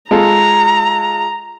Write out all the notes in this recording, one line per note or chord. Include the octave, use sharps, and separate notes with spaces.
G#3 F4 A4 A#5